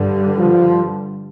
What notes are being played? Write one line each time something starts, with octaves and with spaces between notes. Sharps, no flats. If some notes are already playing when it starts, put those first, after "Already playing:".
Already playing: G2 D3 G3
F3